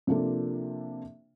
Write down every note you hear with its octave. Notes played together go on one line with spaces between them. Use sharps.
C3 F3 A#3 D4 F4 A4